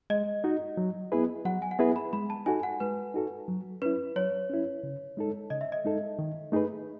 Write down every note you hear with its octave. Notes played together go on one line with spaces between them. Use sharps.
G#3 D#5
D#4 F#4
F#3
B3 E4 G#4 B4
F#3 F#5
G#5
F#5
B3 E4 G#4 B4 E5
B5
G#3 B5
A5
D#4 F#4 A4 G#5
F#5
G#3 B4
D#4 F#4 A4
F#3
C#4 E4 B4
F#3 C#5
C#4 E4
C#3
G#3 D#4 A4
C#3 D#5
E5
D#5
G#3 D#4 A4
D#3
A3 D#4 G#4 B4